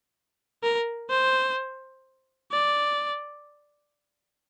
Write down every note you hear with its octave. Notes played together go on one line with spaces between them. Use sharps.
A#4
C5
D5